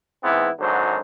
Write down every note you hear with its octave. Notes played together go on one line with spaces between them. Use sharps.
G#2 E3 B3 C4 E4
G#1 G#2 D3 F#3 C5